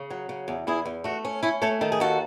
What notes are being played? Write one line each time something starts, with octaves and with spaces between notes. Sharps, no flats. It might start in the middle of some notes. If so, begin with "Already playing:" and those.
Already playing: C#3
F#3
C#3
E2
E2 E4 G#4
E2
A3 F#4
C#4
C#4 E4
A3 A4 C#5
D#3 A4
G#4
D#2 F#4 A4